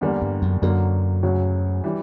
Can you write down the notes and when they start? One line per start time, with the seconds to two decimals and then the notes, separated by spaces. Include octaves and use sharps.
0.01 E2 D3 G3 A#3
0.22 G2
0.42 F#2
0.62 F#2 D3 F#3 A#3
1.23 D2 C#3 F#3 C#4
1.84 E3 G3